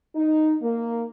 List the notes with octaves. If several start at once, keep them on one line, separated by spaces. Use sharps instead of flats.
D#4
A#3